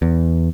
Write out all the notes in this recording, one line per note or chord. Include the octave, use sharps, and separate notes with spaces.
E2